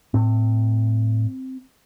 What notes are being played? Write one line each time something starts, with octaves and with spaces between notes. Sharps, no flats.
A2 C4